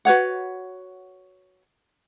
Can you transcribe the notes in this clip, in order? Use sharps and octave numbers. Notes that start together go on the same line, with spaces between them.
F#4 B4 C#5 F#5